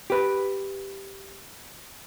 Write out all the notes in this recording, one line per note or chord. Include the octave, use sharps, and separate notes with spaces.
G4 B4